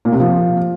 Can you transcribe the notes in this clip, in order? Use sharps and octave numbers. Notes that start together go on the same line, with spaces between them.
A#2
C3
F3